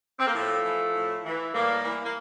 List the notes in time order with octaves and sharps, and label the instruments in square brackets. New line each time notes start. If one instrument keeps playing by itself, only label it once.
[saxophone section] C4
A#3
A2 F3 A3
E3
A2
E3
A2 G3 A#3
E3
A#3